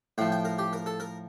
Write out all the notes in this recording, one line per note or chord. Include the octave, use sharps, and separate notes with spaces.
A2 F3 G5
G5
A#4
G4
A#4
A4
A#4